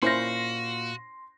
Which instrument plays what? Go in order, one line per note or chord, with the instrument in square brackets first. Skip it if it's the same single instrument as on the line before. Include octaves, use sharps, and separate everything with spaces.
[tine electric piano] A#2 F5 [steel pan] C#4 E4 C5 [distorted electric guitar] F#4 [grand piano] C6 A#6